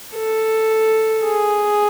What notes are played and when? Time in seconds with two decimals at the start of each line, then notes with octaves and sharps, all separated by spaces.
0.15 A4
1.24 G#4